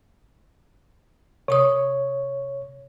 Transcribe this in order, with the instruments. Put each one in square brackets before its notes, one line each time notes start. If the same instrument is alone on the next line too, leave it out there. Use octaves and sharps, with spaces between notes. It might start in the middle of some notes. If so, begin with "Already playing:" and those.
[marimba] C3 C#6 D#6 [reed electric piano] C#5